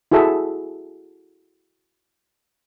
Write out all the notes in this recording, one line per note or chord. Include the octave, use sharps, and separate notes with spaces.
E4 F#4 G#4 A4 E5